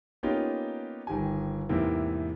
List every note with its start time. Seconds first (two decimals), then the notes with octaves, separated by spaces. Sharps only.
0.23 A#3 B3 C#4 D#4 F4 G4
1.07 G1 D#3 G4 G#5
1.69 E2 G#2 C3 E3 A#3